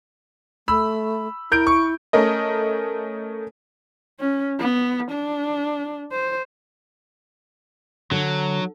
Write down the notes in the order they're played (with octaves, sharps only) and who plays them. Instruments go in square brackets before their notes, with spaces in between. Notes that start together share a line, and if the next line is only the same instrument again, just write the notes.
[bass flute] A3 [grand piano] B5 E6
[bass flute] E4 [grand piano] A#4 G6 D7
[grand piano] C#6
[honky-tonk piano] A3 C#4 A#4 D#5
[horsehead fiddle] C#4
B3
D4
C5
[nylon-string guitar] D3 [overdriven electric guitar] F#3